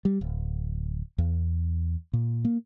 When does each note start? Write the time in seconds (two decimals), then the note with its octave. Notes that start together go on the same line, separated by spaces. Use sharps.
0.05 G3
0.21 D1
1.18 E2
2.13 A#2
2.45 A#3